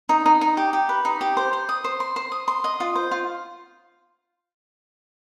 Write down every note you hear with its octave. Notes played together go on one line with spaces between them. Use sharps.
D#4
D#4
D#4
G4
G4
B4
D#4
G4
C5
C5
D#6
C5
C6
C5
D#6
C6
D#5
F4
C5
F4